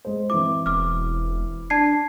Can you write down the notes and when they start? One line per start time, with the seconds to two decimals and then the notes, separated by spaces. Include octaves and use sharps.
0.05 G#3 C5
0.30 E3 C4 E4 D6
0.66 E1 D6 F6
1.70 D4 A5 G#6 C7